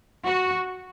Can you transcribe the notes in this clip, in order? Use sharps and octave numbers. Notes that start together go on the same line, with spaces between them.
F#4